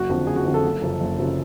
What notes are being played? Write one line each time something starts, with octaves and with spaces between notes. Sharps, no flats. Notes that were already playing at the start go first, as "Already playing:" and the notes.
Already playing: F#1 F#4
F2 D3 F3
F#1 G#4
F#4
F2 D3 F3
A4
F#1
F#2 C#3 F3
F#1
F#2 C#3 F3